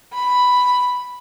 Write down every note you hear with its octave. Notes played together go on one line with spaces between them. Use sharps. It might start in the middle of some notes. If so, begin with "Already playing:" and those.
B5